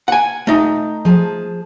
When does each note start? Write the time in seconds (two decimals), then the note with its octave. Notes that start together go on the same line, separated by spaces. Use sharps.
0.08 F#5 G#5
0.47 A3 D#4
1.05 F3 G#4 A5